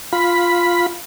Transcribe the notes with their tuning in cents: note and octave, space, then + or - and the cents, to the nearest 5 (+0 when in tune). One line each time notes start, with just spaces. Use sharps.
F4 +0 B5 +0